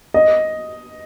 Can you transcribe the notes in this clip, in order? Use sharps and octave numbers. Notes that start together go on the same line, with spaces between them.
D#5